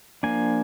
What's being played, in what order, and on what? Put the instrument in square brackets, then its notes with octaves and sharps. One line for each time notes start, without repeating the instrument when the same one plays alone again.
[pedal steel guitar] F3 A#3 D4 G#5